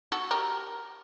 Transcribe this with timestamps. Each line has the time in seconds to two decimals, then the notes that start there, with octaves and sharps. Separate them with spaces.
0.12 F#4 A4
0.31 G4 A#4